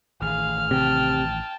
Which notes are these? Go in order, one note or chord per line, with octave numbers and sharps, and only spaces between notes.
A1 D#3 A3 G#4 F5 F6
C3 G5 A5